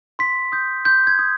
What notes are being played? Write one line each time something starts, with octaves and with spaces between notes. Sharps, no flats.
C6 B6
D#6 G6
C6 G6
G#6
D#6 G6